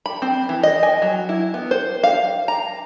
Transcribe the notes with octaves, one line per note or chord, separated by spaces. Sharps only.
B5
C4
E3
D#5
G#5
F#3
E4
B3
C5
F5
A#5